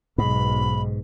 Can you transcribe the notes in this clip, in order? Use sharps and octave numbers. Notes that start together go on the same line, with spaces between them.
B1 G#2 B5